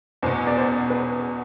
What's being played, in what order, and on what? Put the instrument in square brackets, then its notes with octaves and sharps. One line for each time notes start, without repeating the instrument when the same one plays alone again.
[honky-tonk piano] E2 B2 B3 [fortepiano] C5
[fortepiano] D5
C5
B4